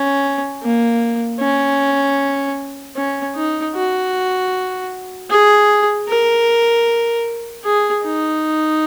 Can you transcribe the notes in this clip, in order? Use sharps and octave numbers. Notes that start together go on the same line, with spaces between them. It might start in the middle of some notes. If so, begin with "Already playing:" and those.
Already playing: C#4
A#3
C#4
C#4
D#4
F#4
G#4
A#4
G#4
D#4